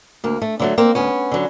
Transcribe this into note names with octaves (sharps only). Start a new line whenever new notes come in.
D2 A#3
A3
D3 F#3 A3 A#3
A#3 C4
D2 B3 C#4
D3 F#3